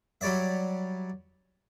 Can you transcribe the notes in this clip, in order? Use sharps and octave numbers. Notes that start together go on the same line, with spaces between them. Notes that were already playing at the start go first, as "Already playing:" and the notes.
F#3 G3 C#5 D5 E5